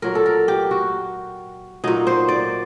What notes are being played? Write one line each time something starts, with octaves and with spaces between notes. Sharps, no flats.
A#2 F#3 A#4
A4
A#4
G4
F#4
A#2 F#3 D#4
C5
D5